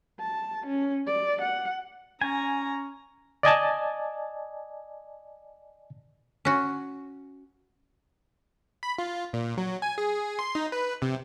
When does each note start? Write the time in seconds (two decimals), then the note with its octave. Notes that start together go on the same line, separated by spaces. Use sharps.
0.20 A5
0.67 C#4
1.07 D5
1.42 F#5
2.21 C#4 G#5 A#5
3.43 D5 D#5 G#5 A5
6.45 C#4 F#4
8.83 B5
8.98 F4
9.33 A#2
9.57 F#3
9.82 G#5
9.98 G#4
10.39 C6
10.55 D#4
10.72 B4
11.02 C3